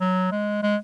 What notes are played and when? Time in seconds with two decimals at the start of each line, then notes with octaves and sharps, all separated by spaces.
0.01 F#3
0.31 G#3
0.63 G#3